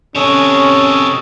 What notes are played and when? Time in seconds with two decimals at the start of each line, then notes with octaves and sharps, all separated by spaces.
0.15 C3 C#4 G#4 A4 C#5 D#5